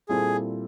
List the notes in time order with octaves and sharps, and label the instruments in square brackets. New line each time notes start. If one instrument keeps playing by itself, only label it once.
[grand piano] A#2 G3 C4 E4 A4 [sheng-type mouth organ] G#4